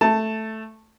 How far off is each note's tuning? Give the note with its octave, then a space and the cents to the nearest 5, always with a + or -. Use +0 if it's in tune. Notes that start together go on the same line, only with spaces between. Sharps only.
A3 +0 A5 +10